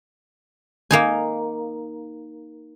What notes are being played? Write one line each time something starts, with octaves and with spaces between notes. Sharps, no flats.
A#3 D#4 G#5